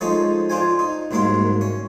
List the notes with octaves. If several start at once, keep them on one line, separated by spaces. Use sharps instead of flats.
F3 G#3 C#4 D#4 A4
D4 F4 C5 G#5
D#4
C2 G#2 F#3 A#3 F5 C6
C#4